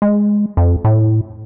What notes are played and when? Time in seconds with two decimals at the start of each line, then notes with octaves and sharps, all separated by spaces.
0.02 G#3
0.57 F2
0.85 A2